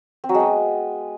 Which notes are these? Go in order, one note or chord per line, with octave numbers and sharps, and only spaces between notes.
C4
F#3
G#3
B3